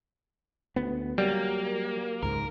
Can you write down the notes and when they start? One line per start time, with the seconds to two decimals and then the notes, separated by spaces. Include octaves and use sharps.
0.76 D2 B3
1.18 F#3 G3 A#3
2.23 C#2 G#2 A#4